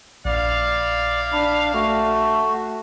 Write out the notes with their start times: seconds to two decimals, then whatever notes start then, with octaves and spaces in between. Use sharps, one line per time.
0.25 A#1 E4 D5 F5
1.33 D4 B5
1.74 A3 F#4